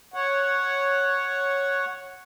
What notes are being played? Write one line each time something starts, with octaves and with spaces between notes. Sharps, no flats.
C#5 F#5